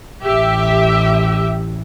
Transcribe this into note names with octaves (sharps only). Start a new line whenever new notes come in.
A1 G4 E5